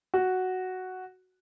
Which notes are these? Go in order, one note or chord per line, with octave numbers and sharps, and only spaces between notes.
F#4